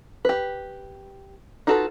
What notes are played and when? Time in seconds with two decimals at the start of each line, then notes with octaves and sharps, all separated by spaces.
0.25 G4 B4
1.67 D#4 F4 F#4 A4 B4